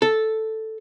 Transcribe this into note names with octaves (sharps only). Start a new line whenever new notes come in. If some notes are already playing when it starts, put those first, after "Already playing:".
A4